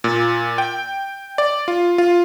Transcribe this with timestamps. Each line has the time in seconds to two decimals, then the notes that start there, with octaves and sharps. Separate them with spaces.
0.04 A#2
0.58 G5
1.38 D5
1.68 F4
1.98 F4